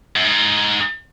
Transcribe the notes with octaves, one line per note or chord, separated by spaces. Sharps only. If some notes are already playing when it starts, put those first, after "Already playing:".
F#2
G#2